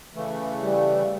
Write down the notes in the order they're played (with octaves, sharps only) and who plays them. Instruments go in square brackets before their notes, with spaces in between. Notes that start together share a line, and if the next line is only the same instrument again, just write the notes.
[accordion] C#3 E3 A3
[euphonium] G3